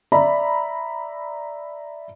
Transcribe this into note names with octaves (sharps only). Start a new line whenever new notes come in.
D5 E5 A#5 B5